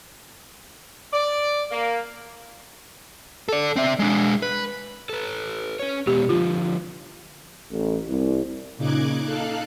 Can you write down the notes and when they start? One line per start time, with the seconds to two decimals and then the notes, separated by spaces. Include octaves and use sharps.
1.13 D5
1.71 A#3
3.49 A4 D5
3.76 C4 E5
3.99 G#3 D4
4.42 B4
5.10 A4 B4
5.79 C#4 C#5
6.07 B2 G#3 B3 G4
6.29 D3 F3 F4
7.71 A1
8.08 C2
8.77 A#2 C#3 D#4 D6 F#6 G#6
9.25 D#4 A4 F5 F#6